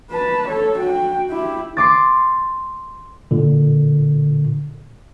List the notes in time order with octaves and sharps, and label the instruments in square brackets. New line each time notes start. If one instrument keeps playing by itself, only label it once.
[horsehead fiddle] B4 A5
A4 C#5
F#4 G5
E4 G4
[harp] C6 D6 A6
[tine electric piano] A#2 D3